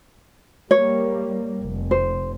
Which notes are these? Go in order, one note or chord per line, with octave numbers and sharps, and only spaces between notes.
G3 A#3 C#5
F1
C5